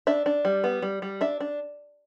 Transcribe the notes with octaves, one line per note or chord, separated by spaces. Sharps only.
D4 E5
D4
G3
B3
G3
G3
D4 E5
D4